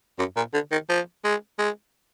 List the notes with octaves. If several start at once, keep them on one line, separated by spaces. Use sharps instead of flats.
F#2
A#2
D3
D#3
F3
G#3
G#3